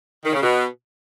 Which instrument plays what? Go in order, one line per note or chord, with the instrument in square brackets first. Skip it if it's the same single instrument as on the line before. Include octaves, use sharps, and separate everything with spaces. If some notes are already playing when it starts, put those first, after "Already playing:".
[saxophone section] D#3
C#3
B2